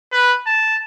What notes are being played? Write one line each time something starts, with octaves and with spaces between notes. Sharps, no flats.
B4
A5